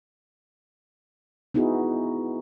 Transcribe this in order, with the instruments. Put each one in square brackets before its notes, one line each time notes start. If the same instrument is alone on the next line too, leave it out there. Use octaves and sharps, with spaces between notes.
[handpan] B3 D#4 E4 F#4 G#4